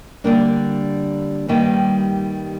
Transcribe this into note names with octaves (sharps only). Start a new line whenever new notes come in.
D3 G3 A#3 D4
G2 D#3 G3 A#3 D#4